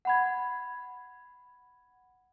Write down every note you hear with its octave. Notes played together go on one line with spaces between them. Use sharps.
F#5 B5 G#6